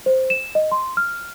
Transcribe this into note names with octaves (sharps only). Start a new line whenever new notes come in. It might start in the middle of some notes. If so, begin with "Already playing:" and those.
C5
E7
D#5
C6
F6